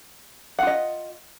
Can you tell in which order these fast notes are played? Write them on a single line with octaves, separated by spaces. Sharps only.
F#5 F4 D#5